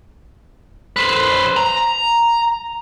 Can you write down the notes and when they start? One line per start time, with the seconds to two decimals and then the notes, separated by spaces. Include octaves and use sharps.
0.96 B4 C5
1.57 A#5